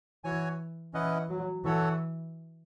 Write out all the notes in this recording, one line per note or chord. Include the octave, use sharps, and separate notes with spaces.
E3 F#4 C#5 G#5
E3 C#4 E4 B4 D#5 F#5
F#3
E3 F#4 A4 C#5 F#5